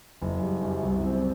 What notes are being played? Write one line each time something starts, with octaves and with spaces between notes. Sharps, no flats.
F#1
G3
F#2
C2
C4